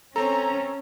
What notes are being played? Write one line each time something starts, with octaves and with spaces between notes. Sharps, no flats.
C4 C#4 A4 A#5